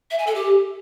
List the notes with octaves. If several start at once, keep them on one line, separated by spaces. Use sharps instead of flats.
E5
G#5
A4
G4